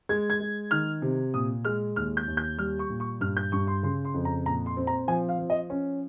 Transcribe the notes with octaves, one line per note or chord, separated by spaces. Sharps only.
G#3 G#6
G#6
G#3
D#3 F6
C3
A#2 D#6
G#3 F6
D#2 F6
G6
D#2
G6
G3 F6
C#6
A#2
C#6
G2 F6
G6
G2 C#6
C6
C#3 C6
C6
F2
A#5
A#2 A#5
C6
C4
A#5
F3 G#5
F5
F3
D#5
C#4